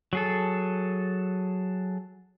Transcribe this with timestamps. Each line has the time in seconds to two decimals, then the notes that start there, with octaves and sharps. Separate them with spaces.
0.13 F#3 G#4 A4